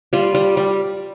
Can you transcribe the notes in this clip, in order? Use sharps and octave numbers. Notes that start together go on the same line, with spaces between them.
G3 F4
G3
G3